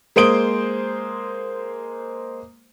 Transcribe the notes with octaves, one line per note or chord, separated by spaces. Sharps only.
G#3 A#3 C5 D#6 D7 G7